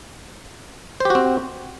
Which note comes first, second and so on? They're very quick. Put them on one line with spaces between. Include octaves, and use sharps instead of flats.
C5 G4 F#4 C4